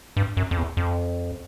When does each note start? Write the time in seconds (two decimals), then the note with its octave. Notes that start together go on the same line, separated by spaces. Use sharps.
0.17 G2
0.37 F#2
0.51 F2
0.57 E2
0.77 F2